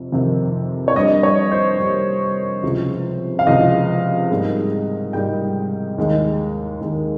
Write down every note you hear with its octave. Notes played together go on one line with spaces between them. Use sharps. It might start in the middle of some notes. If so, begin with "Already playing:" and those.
Already playing: F2 C3
F2 C3 D#3
C#5
G2 G3 A#3 D#5
C#5
C5
G2 G3 A#3
C#2 C3 F3
F5
C#2 C3 F3 D#5
G#2 G3 A#3 D#4
G#2 G3 A#3 D#4 G5
D#2 D#3 G#3 D#4
D#2 D#3 G#3 D#4